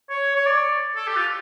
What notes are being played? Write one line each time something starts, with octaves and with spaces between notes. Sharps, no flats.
C#5
C#5
D5
A4
G4
F4